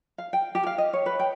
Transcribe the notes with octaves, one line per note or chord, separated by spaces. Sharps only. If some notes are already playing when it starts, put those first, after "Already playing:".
F5
G5
G4
F5
D#5
C#5
B4
G5